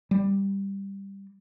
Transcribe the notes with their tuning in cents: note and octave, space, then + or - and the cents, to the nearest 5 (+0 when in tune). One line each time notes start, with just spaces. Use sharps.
G3 +5